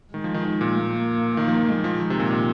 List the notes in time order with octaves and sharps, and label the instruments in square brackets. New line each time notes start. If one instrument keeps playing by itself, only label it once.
[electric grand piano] D#3 [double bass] G#3
[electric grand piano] F3
D#3
D#3
A#2
[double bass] A#3
[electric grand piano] D#3 [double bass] A#3
[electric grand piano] F3
F3
[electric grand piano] D#3 [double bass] G#3
[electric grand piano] F3
D#3
C3
A#2
A#2